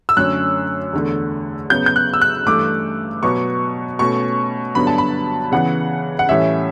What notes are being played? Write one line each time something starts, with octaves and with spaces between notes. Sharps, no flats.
E6
F#2 D3 A3 C#4 F#6
E2 D3 A3
C#3 F#3 B3 G6
G6
F#6
E6
F#6
G2 E3 A3 D6
B2 F#3 B3 C#6
B2 A3 C#4 C#6
G2 D3 F#3 B3 B5
A5
B5
C#3 E3 B3 F#5
F#5
A2 E3 G3 C#4 E5